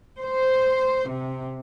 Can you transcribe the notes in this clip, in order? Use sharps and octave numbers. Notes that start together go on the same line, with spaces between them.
C5
C3